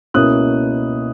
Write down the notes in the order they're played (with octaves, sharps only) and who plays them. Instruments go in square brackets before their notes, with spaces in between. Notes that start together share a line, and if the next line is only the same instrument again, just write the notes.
[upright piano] C#2 B2 A#3 C#4 E4 D#6 F#6